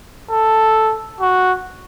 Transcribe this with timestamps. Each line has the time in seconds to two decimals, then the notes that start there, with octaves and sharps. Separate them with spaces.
0.31 A4
1.21 F#4